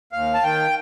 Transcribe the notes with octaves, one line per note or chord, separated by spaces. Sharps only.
D#2 F5
A5
D#3 G5